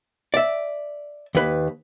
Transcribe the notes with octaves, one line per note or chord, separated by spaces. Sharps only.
D5 E5
D#2 B4